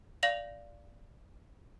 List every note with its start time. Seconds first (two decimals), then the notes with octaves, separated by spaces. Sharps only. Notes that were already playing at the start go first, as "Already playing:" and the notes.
0.23 D5 F5 A#6 F7 F#7